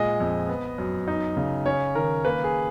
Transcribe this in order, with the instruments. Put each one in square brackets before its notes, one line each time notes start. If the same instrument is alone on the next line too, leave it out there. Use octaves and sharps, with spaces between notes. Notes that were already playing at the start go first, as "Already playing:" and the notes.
Already playing: [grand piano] A#2 G#3 D#5
F2
B3
F#2
D#4
C#3
C#4 C#5
D#3 A#4
A#3 B4
G#4